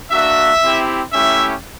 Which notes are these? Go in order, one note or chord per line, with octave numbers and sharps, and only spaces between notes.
A#3 D4 F#4 E5
C4 E4 G4
A3 C#4 E4 G4 E5